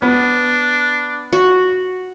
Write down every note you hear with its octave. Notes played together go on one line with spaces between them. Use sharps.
B3 D4
F#4